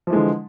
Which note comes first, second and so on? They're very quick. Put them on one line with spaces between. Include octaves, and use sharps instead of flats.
F3 E3 G#3 D3